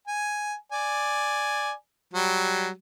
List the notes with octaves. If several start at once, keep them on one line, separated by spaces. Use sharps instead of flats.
G#5
D5 G#5
F#3 G3